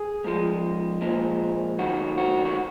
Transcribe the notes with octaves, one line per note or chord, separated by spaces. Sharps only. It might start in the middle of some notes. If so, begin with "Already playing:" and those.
Already playing: G#4
G#2 F3 G#3
A#2 F3 G#3
D#2 D#3 F#3 F#4
F#4
F#4